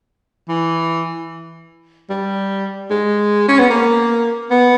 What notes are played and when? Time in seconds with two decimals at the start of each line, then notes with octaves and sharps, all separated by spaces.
0.49 E3
2.10 G3
2.90 G#3
3.48 C#4
3.59 B3
3.70 A#3
4.50 B3